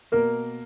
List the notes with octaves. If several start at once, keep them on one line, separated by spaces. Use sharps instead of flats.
B2 A#3 A#4